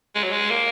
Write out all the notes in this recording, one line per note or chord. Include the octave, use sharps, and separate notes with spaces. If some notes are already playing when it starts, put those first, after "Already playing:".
G#3
F#3
G#3
A#3